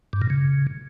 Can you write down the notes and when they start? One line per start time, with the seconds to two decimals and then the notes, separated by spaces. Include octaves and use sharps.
0.13 G2
0.22 A#2
0.30 C#3